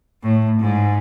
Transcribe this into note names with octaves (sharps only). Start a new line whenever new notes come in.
A2
G#2